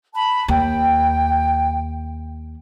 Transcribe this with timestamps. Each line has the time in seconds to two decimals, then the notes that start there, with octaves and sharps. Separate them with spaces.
0.14 A5 B5
0.48 D#2 G5